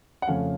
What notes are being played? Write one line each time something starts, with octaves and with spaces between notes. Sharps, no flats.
F#5
F2 C#3 F3 A3 C#4 F5